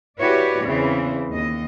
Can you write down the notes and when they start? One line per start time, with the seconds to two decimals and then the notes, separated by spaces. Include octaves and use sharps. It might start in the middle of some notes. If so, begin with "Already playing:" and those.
0.20 E4 F#4 G4 B4 C#5 D5
0.64 E2 C#3 E3 C4
1.32 D#2 D#5